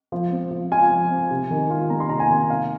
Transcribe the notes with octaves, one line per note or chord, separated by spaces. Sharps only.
F3
C4
F3
F4 G#5
F3
C4
C3
D#3
F4
A#3 A#5
C6
C3 A#5
G#5
D#3
C3 F5